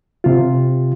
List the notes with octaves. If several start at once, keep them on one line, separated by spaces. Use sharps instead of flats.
C3 F4